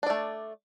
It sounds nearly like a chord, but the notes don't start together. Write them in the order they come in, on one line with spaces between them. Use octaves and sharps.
D4 D5 A3